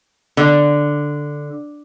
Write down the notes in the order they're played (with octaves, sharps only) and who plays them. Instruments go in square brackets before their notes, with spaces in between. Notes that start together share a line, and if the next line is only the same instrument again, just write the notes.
[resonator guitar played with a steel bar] D3